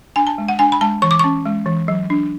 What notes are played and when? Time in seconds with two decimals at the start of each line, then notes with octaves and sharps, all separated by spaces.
0.16 D4 G#5
0.27 A5
0.38 G#3
0.48 F#5
0.59 D4 G#5
0.72 B5
0.81 G#3 A5
1.02 E3 C#6
1.11 D6
1.19 C#4 C#6
1.45 G#3
1.66 E3
1.88 F#3
2.10 D4